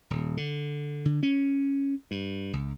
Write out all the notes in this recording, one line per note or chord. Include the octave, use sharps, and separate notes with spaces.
D#1
D3
D3
C#4
G2
C#2